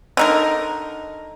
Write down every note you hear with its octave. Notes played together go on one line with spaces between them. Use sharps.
D3 D#4 A#4